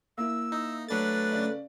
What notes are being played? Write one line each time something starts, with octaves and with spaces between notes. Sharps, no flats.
A#3 E4 E6
D#4
F#3 A3 D4 B4 A6
C#3 D5